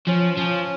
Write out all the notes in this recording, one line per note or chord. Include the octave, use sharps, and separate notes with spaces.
F3 C#4
F3 C#4